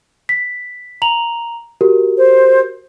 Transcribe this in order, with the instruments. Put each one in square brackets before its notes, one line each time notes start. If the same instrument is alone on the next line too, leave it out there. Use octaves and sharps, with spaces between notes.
[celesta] B6
A#5 F7 F#7
F#4 G4 A#4
[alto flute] C5